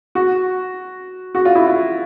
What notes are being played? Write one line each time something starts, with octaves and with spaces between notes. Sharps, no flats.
F#4
F#4
F4
E4
F4